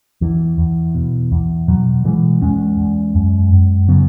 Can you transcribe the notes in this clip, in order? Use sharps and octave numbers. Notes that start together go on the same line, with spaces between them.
E2 E3
E2
B2
E2
B2 F#3
B2 E3 G#3
E2 G#3 C#4
E2
F#2
F#2
C#3 F#3 B3